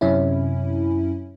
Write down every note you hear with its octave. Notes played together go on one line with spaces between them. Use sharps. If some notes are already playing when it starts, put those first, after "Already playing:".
F#2 C3 C#4 E4